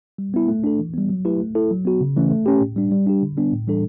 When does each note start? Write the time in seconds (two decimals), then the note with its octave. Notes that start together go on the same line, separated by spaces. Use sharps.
0.18 G3
0.34 B3 E4
0.48 A3
0.64 D4 A4
0.79 E3
0.94 G3 B3
1.09 F#3
1.25 A3 E4 G4 B4
1.40 A3
1.55 E4 A4
1.71 F#3
1.85 B3 F#4
2.01 C#3
2.16 E3 A3 C#4
2.30 A3
2.46 C#4 G4
2.61 A2
2.76 G3 D4
2.91 G3
3.06 D4 G4
3.22 D3
3.37 G3 B3 D4
3.52 A2
3.67 E3 G3 D4 A4